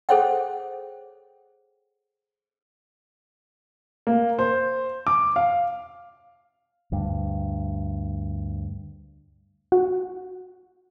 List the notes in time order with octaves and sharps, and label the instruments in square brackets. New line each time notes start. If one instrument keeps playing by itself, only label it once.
[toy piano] G#4 A4 C5 C#5 F#5 G5
[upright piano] A#3
C5
D6
F5
[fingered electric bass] D2 G2
[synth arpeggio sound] F#4